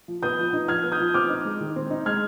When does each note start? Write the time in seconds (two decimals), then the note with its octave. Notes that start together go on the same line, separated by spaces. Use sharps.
0.08 F3
0.23 B3 D#6 G6
0.39 F3
0.53 D#4
0.68 F3 F6 G#6
0.83 B3
0.92 D#6 G6
1.00 F3
1.14 C4 D6 F6
1.29 D#4
1.45 G#3
1.61 D#3
1.76 C4
1.90 D#4
2.06 G#3 F6 G#6